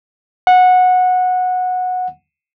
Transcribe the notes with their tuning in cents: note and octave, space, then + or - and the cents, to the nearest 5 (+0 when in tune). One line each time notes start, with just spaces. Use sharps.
F#5 -15